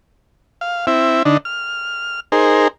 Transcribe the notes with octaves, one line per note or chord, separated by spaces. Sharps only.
F5
C4 E4 E5
D3 D4 D#4
F6
D#4 G#4 A#4 C5